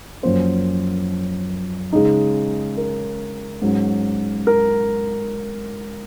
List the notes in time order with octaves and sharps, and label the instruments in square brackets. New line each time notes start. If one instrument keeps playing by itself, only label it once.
[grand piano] F#2 F3 A#3 C#4 C5
C#3 G#3 D#4
A#4
G#2 F#3 C#4
A#4